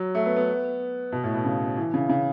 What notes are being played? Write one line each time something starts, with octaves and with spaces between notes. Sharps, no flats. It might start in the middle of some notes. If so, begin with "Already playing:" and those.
Already playing: F#3
A3
B3
B3
B2
A2
B2
C#3
E3
C#3
C#3